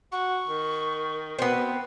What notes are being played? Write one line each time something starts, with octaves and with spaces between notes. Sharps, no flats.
F#4 C#6
D#3
B2 B3 C4